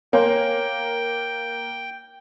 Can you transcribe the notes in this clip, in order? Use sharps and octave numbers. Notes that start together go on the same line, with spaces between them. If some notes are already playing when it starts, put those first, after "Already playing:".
A#3 C#5 G5 G#5 C6